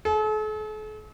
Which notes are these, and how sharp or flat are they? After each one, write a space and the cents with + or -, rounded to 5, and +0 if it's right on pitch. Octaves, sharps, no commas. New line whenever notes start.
A4 -45